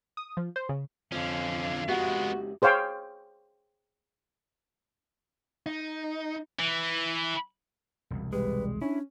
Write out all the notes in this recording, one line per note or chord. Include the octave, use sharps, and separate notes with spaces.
D#6
F3
C5
C#3
F2 D3 F3 C#4 F5
C#2 G#3 B3 F#4 G4 B5
G#4 C5 C#5 F5 G5
D#4
E3
E1 C2
G3 G#3 B4
C#4 D4 E4